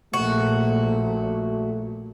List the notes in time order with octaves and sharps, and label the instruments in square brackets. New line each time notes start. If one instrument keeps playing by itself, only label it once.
[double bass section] A#1 A#2 [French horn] A3 [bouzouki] F#4